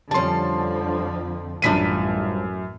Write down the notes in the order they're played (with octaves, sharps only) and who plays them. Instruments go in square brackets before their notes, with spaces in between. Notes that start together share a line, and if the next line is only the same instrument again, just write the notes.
[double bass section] F2 D3 F3 [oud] G3 C#4 [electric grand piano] A5 C6
[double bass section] A1 [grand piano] F#2 B6 D#7 [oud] F3 G3 D4